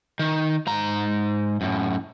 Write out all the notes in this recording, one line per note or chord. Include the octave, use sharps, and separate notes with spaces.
D#3
G#2 A#5
F#2 A2